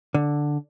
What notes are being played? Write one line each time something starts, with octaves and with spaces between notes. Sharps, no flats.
D3